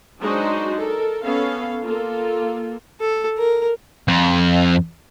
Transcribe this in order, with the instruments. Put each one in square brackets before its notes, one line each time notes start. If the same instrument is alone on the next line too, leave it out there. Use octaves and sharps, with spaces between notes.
[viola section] F#3 G#3 D4 D#4 F#4 C5
A4 A#4
B3 C#4 A4 F5
A#3 F4 A4
[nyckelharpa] A4
A#4
[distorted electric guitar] F2